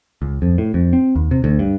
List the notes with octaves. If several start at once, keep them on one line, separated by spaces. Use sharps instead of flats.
C#2
F2
A2
F2
C4
D#2
C3
D2
G2